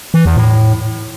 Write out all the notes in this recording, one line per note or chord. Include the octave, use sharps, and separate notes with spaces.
E3
E2
A2